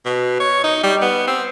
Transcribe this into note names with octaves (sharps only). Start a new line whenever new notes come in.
B2
C#5
D#4
G3
B3
C4